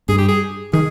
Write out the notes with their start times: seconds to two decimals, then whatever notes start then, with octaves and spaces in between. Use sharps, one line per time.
0.09 G2 G#4
0.18 G4
0.28 G#4
0.73 D#3 G#4